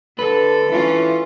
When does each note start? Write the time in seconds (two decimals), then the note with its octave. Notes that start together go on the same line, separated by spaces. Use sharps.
0.19 D3 A4 B4
0.71 E3 C#4 F4